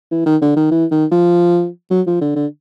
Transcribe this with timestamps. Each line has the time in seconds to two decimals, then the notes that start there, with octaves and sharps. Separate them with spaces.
0.11 E3
0.26 D#3
0.42 D3
0.56 D#3
0.71 E3
0.91 D#3
1.11 F3
1.91 F#3
2.07 F3
2.21 D3
2.35 D3